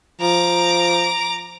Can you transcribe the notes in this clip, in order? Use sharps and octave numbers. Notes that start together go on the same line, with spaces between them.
F3 A#5 D6